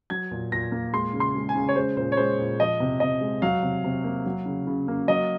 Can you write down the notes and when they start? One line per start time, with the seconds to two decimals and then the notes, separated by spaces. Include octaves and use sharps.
0.10 F#3 G#6
0.31 A#2
0.52 A#2 A#6
0.72 A#3
0.93 G#3 C6
1.13 C#3
1.20 C6
1.35 G#3
1.49 G#5
1.55 C#3
1.69 C#5
1.76 G#3 C5
1.96 A#2 C5
2.12 C#5
2.17 G#3 C5
2.39 A#2
2.60 F3 D#5
2.80 C3
3.00 C3 D#5
3.21 G#3
3.42 F#3 F5
3.63 C3
3.84 C3
4.04 A#3
4.26 F#3
4.46 C#3
4.67 C#3
4.88 A#3
5.08 F#3 D#5